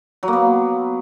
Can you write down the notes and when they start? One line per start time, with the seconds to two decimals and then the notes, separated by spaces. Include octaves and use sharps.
0.23 F#3
0.28 A#3
0.33 B3